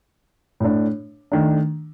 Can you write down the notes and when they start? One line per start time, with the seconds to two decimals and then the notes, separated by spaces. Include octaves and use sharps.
0.60 A2 A3 D4
1.32 D#3 A3 D4